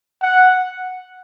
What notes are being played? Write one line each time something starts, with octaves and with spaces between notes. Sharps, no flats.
F#5